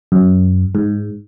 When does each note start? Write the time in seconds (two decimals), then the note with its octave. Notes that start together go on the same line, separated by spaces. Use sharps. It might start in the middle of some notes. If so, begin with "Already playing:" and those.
0.12 F#2
0.75 G#2